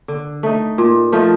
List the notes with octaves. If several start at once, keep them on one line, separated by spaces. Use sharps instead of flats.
D3
A3 D#4
A#2
F3 A3 D#4